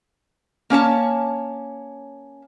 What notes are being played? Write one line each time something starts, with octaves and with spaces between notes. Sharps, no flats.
A#3 C#4 C#5 A5